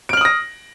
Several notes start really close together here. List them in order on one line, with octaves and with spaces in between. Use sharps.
D7 F6 F#7 D#6 A#6